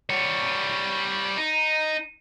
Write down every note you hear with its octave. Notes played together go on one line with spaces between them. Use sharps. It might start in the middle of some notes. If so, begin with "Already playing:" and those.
G3 C#5
D#4